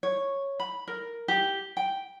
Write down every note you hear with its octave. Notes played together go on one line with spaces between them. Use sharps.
C#5
B5
A#4
G4
G5